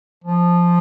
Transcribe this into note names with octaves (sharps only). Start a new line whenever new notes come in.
F3